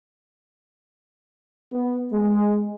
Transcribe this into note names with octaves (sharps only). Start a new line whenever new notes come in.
B3
G#3